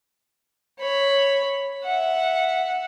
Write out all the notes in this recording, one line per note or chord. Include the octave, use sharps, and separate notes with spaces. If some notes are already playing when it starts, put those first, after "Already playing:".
C#5 B5
E5 F#5